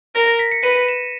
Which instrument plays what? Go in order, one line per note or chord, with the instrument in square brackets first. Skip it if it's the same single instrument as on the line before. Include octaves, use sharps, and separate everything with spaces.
[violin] A#4 [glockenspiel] A#6
[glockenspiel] A#6
B6
C#7
[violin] B4 [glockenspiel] D#7
[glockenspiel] E7